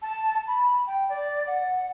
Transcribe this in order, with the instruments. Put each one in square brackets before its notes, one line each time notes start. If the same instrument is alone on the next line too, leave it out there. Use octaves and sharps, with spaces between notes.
[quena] A5
B5
G5
D5
F#5